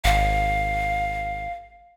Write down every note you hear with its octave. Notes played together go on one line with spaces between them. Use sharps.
G#1 F5